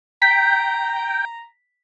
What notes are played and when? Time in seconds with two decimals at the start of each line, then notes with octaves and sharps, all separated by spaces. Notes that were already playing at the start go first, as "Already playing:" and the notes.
0.22 G5 A#5 B6